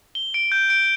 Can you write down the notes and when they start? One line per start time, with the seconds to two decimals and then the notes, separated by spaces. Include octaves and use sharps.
0.15 G7
0.34 D7
0.52 G6
0.70 D7